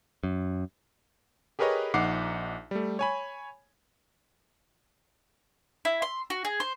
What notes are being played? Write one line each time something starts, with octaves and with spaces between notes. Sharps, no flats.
F#2
G4 G#4 A#4 B4 C#5 D#5
A#1 D#4 F#5 D6 C7
G3 A3
C#5 G#5 B5
E4
C6
F#4
G#4
C5